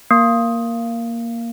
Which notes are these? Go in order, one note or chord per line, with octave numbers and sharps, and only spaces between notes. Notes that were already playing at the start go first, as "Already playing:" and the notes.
A#3